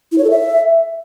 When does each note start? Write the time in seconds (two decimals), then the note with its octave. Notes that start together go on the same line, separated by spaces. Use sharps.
0.12 E4
0.18 C#5
0.24 A4
0.30 E5